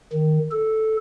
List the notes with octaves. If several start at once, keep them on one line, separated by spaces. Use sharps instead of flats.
D#3
A4